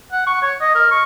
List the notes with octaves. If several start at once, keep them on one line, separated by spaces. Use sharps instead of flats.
F#5
C#6
C#5
D#5
A#4
C#6